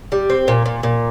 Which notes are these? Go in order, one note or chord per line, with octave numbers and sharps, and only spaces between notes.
G3
C4
A#2
A#2
A#2